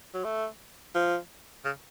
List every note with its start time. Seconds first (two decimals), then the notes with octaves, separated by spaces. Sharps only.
0.14 F#3
0.24 A3
0.94 F3
1.65 C#3